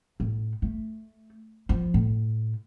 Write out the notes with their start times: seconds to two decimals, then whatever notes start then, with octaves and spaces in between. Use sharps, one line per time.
0.20 A2
0.62 A3
1.69 F3
1.94 A2